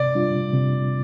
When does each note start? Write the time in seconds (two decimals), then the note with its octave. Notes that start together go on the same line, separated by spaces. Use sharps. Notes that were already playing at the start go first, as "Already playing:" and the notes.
Already playing: C3 D5
0.15 G3 D4 F4
0.53 C3